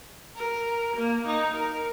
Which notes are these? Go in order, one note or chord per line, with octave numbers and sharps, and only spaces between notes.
A#4
A#3
D#4
A#4